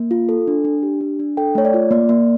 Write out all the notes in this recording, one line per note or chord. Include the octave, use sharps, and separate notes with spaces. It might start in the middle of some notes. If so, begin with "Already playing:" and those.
Already playing: A#3
F4
A4
D4
D4
G4
D4
D4
A4 G5
A3 C#5
D5
F4
A#3 D5
A#3